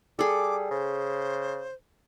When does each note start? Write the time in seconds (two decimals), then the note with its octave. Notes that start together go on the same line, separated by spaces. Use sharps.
0.19 G3 G#4 A4 D6
0.71 C#3 C5